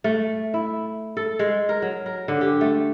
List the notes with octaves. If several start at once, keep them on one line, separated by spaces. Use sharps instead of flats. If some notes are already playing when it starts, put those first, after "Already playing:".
A3
E4
A4
G#3
A#4
F#3
A#4
D3
G4
A3